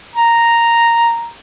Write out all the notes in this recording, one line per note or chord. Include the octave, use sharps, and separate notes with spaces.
A#5